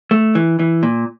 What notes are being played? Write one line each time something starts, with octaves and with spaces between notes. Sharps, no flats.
A3
E3
E3
A#2